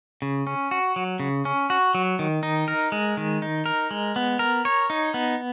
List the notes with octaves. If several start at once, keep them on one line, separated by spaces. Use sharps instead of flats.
C#3
C#4
F#4
F#3
C#3
C#4
F#4
F#3
D#3
D#4
A#4
G#3
D#3
D#4
A#4
G#3
B3
A#4
C#5
D#4
B3